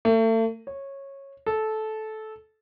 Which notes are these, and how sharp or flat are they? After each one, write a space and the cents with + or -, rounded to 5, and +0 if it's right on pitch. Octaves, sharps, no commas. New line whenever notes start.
A3 +35
C#5 -15
A4 -15